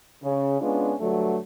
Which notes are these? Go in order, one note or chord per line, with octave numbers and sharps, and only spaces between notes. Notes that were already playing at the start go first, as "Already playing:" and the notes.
C#3
G#3 B3 C#4 D4 F4
G2 D3 F#3 A3